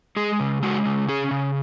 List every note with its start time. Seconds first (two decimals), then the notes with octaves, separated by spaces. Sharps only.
0.16 G#3 G#4
0.40 C#3
0.63 G#3 F#4
0.86 C#3
1.08 C#4 G#4
1.31 C#3